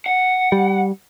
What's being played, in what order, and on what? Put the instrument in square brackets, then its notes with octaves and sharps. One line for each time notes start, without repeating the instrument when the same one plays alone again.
[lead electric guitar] F#5
[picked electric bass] G3